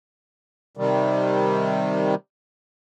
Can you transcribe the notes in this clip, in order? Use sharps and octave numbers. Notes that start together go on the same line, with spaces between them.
C3 D#3 G3